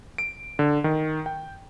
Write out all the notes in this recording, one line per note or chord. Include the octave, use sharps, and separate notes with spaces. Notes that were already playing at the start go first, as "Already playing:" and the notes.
D7
D3
D#3
G5